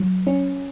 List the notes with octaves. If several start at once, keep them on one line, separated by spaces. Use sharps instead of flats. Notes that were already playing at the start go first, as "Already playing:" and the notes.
Already playing: F#3
C#4